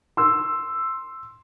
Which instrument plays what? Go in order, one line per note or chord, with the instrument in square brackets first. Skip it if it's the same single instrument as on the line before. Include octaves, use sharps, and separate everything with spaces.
[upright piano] C6 E6